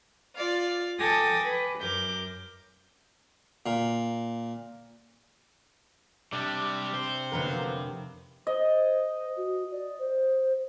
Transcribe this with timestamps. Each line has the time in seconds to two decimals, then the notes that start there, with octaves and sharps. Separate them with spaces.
0.36 F4 D5 F5
0.99 A4 G5 G#5 D6 D#6 A#6
1.43 B4
1.80 F#2 A#4 D6 G6
3.66 A#2
6.33 C3 G3 D4
6.94 C5 C7
7.32 F1 D3 F#3 A#3 B3 A#4
8.47 C5 D#5
9.37 F#4
9.72 D5
9.99 C5